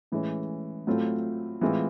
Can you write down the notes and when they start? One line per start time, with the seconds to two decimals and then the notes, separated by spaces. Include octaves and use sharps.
0.12 A2 E3 G#3 C#4
0.87 A2 F#3 A3 C4 F4
1.61 A2 E3 G#3 C4 F4